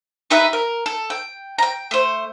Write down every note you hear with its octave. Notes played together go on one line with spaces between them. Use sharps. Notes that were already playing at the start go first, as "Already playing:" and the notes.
D#4 G4 B4 E5
A#4
A4
G5
G5 A#5
A3 C5